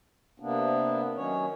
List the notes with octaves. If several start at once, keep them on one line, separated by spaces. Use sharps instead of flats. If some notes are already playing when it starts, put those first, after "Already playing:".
C3 A#3 B3 D4
D#3 F#3 C#4 C#5